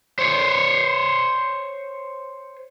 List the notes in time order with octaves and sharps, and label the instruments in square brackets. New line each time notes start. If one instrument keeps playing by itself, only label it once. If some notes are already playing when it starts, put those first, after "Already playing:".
[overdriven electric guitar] C5 C#5